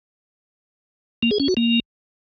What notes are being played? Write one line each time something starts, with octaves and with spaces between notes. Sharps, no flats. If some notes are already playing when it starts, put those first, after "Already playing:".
A#3
G#4
C#4
F#4
A#3